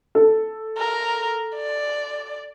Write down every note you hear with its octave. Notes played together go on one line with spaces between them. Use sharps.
A4
A#4
D5